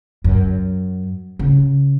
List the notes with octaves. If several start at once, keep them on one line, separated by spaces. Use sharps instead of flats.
F#2
C#3